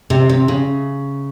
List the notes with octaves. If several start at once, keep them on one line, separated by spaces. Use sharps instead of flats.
C3
C3
C#3